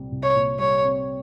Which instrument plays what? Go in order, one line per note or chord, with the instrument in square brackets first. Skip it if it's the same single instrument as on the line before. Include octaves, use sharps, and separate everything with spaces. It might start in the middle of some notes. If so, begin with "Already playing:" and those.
Already playing: [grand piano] C2 A#2 G3 C4
C2
[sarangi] C#5
[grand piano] A#2
[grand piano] G3 [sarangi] C#5
[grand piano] C4